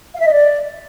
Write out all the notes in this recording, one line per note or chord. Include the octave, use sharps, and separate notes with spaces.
F5
E5
D#5
D5